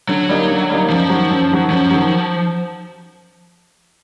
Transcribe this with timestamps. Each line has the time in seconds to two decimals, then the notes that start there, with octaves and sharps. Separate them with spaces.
0.09 D3 F#3
0.29 G3 A#3 D#4
0.50 D3
0.70 G3 A#3 D#4
0.89 F#2 F3
1.10 D#3 F#3
1.30 F#2
1.51 D#3 F#3
1.71 F#2 F3
1.91 D#3 F#3